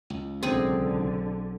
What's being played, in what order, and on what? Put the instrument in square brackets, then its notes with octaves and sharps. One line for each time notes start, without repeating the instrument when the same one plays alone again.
[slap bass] C#2
[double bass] B1 [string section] D3 [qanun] C4 G#4